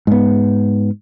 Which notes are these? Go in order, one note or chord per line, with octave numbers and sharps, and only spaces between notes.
G#2 B3